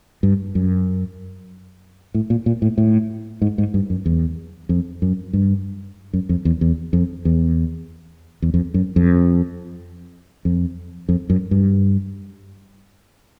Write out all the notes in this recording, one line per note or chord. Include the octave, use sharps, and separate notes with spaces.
G2
F#2
A2
A#2
A#2
A2
A2
G#2
G#2
G2
F#2
E2
F2
F#2
G2
F#2
F2
E2
E2
F2
E2
E2
F2
F#2
F2
F2
F2
F#2
G2